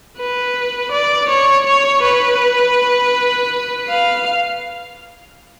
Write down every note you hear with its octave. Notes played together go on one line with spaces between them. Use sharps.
B4
D5
C#5
C#5
B4
F5